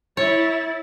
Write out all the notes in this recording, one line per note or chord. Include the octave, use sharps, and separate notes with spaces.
E4 C#5 A6